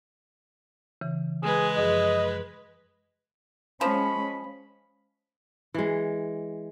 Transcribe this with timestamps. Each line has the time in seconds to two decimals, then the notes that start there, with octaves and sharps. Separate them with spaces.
1.01 C#3 E3
1.43 G#3 G#4 B4
1.77 F#2 F3 G#4 D#5
3.81 F3 G#3 C#4 B5
5.74 E3 G#3